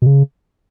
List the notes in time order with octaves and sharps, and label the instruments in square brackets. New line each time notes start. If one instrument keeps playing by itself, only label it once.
[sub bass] B2
C#3